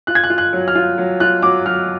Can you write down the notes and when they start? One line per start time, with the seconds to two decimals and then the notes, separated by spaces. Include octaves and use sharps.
0.07 F4 F#6
0.15 G#6
0.24 F#6
0.30 F4
0.38 F#6
0.53 F#3
0.68 F6
0.75 F4
0.98 F#3
1.20 F4 F#6
1.43 F#3 D6
1.66 F#3 F6